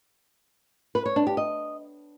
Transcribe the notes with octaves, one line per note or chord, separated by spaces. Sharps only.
B4
C#5
D4
G4
D#5